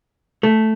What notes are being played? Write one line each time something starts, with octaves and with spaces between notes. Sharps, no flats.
A3